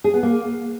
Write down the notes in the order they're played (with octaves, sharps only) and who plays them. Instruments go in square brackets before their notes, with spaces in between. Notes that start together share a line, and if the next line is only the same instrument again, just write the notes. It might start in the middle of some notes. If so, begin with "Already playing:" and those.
[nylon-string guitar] G#4
B3
A#3